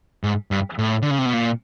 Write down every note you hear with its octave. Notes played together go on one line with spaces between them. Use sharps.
G#2
G2
A2
D3
C#3
C3
B2
A#2